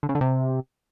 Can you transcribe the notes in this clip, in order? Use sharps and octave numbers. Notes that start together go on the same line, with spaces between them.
D3
C#3
D3
C3